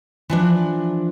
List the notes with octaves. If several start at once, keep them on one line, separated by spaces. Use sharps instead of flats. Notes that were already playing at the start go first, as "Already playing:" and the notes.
E3 F3 D4